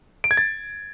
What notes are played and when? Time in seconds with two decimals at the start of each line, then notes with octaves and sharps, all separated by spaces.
0.24 D7
0.31 G#6
0.37 A6